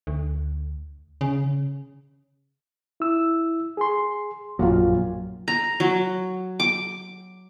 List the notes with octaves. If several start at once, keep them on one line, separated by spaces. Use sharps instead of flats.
D2
C#3
E4 E6
G#4 C6
A#1 F#2 A#2 F#3 F4
A#5
F#3
D6